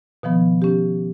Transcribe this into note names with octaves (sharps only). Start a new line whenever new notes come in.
B2 D#3 F3 B3
C#4 G4